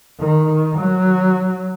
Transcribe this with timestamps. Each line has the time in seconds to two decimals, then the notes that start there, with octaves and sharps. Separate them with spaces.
0.20 D#3
0.79 F#3